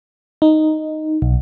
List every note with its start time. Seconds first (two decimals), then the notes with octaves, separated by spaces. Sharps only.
0.42 D#4
1.22 B1